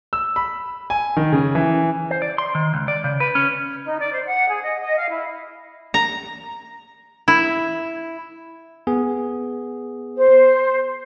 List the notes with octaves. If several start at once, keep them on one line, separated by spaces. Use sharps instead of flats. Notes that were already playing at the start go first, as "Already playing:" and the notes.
E6
B5
G#5
D#3
C#3
E3
C5
D5
C6
D#3
C#2
D5
C#3
B4
C#4
D#4
D5
C5
F#5
G#4
D#5
D#5
F5
E4
A#5
E4
B3 G#4
C5